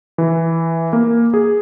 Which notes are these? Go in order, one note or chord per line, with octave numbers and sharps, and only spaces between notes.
E3
A#3
G#4